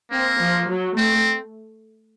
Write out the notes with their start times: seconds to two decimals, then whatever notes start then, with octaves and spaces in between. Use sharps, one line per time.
0.11 A#3 C4
0.40 F3
0.68 F#3
0.96 A3 C4